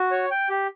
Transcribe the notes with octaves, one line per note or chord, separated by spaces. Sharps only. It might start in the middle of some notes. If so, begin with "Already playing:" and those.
Already playing: F#4
C#5
G5
G4